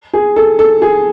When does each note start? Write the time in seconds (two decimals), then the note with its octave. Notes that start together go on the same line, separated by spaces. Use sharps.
0.13 G#4
0.36 A4
0.59 A4
0.82 G#4